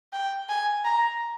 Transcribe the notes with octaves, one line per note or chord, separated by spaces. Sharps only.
G5
G#5
A#5